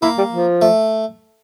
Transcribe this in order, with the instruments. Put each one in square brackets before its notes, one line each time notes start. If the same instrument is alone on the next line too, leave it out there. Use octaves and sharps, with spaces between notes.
[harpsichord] A#3 [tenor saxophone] E4
[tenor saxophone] G3
F3
[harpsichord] A3